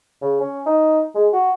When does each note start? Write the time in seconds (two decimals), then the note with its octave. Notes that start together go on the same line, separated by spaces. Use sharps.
0.22 C#3
0.40 C#4
0.66 D#4
1.15 G#3
1.33 F#4